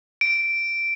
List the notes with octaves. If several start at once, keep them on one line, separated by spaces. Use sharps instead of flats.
D7